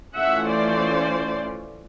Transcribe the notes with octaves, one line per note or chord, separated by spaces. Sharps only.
E3 A3 C#4 F4 E5 F#5
C5 D5